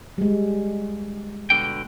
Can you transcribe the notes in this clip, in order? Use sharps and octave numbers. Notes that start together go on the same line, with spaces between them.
G3 G#3
B2 D3 G5